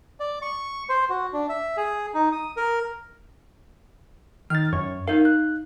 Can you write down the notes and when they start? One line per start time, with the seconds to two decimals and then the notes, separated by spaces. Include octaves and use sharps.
0.20 D5
0.42 C#6
0.89 C5
1.09 F#4
1.33 D4
1.49 E5
1.77 G#4
2.14 D#4
2.32 D#6
2.57 A#4
4.50 D#3 F6 A6
4.73 F#2 C#5
5.08 D#4 A#4 F5
5.25 F#6